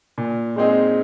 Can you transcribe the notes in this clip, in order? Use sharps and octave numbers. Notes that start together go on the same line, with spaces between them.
A#2
G#3 C4 D#4 G#4